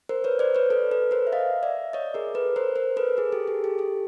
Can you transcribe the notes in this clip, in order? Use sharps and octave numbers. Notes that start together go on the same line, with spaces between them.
A#4 C5
B4 C#5
C5 D5
B4 C#5
A4 B4
A4 B4
A#4 C5
E5
D#5 F5
D5 E5
C#5 D#5
G#4 A#4
A4 B4
A#4 C5
A#4 C5
A4 B4
G#4 A#4
G4 A4
G#4
G4 A4
G4 A4